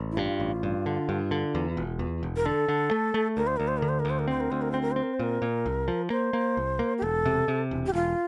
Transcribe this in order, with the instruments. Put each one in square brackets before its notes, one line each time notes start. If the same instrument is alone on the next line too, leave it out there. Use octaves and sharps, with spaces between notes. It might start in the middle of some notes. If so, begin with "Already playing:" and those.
Already playing: [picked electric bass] A1
[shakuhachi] E4
[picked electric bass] G2 [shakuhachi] F4
[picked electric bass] A1
G2
D3
G2
D3
E2
E1
E2
E1
[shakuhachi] A#4
[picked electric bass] D3 [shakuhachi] A4
[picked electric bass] D3
A3
A3
[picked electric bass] D2 [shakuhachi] A#4
[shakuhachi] C5
[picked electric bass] D2 [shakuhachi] A#4
[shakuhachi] C5
[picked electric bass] D3 [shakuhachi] A#4
[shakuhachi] C5
A#4
[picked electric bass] D2
[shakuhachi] C5
A#4
[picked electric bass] C4 [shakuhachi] C5
[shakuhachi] A#4
[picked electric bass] D2 [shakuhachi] C5
[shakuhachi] A#4
[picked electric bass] C4 [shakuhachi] C5
[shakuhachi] A#4
[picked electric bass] C4 [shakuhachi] C5
[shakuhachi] A#4
C5
[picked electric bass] A#2 [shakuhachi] A#4
[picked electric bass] A#2
C2
F3
[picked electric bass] A#3 [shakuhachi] C5
[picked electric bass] A#3
C2
A#3
[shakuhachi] G4
[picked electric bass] E1 [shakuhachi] A4
[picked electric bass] C3
C3
E1
[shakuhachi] G4
[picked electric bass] E1 [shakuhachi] F4